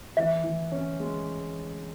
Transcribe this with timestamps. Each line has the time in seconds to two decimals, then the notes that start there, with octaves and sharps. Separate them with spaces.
0.17 E3 E5
0.44 E3
0.72 C#4
1.00 G#3